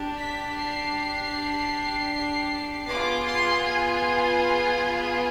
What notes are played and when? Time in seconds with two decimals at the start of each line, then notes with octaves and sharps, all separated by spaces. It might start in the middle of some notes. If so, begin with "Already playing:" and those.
Already playing: D4 G4
0.19 B6
0.58 C7
2.89 B3 F4 G#4 D6
3.27 C6
3.66 G#5